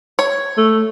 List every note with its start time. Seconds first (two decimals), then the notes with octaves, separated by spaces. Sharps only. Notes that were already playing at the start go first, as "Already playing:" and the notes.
0.19 C#5
0.58 A3